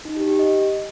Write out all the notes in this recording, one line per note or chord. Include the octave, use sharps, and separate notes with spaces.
D#4
G4
G4
D#5